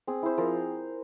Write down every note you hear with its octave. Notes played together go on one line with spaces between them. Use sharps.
C4 G#4
E4 C5
F3 A#4